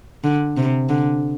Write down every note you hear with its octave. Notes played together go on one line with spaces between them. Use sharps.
D3
C3
D3